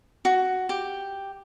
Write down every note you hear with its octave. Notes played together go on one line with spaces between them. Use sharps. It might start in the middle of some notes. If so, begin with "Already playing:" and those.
F#4
G4